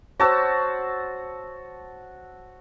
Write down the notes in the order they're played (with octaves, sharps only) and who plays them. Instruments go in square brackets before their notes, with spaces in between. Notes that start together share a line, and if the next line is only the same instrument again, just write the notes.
[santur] F#4 A5 E6 [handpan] C5 C#5